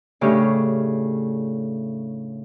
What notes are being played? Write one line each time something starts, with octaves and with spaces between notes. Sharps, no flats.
A2 C#3 C#4 D4 G4